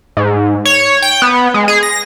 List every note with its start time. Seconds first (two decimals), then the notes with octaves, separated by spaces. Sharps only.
0.17 G#2
0.65 C#5
1.02 G5
1.22 B3
1.54 G#3
1.68 G#4
1.83 A#6